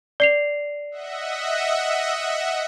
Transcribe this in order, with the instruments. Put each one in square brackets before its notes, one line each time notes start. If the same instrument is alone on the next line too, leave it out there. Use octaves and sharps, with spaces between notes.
[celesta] D5 C7 F7
[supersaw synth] D#5 E5 F#5